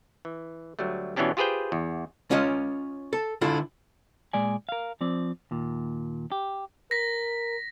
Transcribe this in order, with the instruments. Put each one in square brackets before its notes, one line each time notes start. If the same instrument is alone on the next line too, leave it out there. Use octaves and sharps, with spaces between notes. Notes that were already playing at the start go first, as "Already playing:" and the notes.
[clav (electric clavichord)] E3
D2 F#3 G3 A3
B2 E3 B3 C#4 D4 G4
F4 G4 G#4 B4 C5 G5
E2
[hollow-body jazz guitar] C#4 F4 C#5 D#5
A4
D3 E4 F4 A4
[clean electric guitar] A#2 G#3 D5 G#5
A#4 F5
F3 C4 D5
D#2 A#2
G4
[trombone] A#4 [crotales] A#6 B6